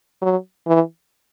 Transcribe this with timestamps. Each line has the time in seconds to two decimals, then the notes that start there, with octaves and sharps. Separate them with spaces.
0.22 F#3
0.67 E3